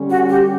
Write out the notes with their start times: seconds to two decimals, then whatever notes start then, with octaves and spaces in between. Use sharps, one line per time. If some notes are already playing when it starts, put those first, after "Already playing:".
Already playing: D3 G3 C#4
0.09 F#4
0.28 G4